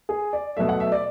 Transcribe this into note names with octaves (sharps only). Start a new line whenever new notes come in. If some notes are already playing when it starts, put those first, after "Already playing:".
G#4
D5
B2 F#3 A3 E5
F#5
E5
D5